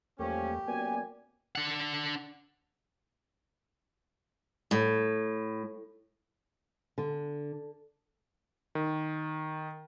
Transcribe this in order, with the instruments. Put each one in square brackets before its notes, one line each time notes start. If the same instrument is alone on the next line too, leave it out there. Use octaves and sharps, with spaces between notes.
[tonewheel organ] E2 A3 A#3 [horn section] F3 G3 C#4 [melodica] G4
[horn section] F#2 F#4 G#5 [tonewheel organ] A#3 B3 D5
[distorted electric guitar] D4 F#5
[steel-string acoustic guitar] A2
D3
[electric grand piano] D#3